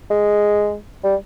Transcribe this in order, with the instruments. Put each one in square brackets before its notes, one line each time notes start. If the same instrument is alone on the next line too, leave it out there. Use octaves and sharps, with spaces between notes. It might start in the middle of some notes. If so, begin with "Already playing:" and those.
[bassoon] G#3
G3